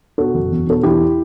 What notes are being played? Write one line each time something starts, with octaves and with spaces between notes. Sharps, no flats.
B2 F#4 A4
F#1
E2
B2 A4
E2 E4 G4